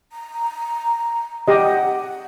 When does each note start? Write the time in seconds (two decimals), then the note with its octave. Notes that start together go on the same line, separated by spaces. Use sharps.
0.12 A#5
1.48 G4 D#5 F#5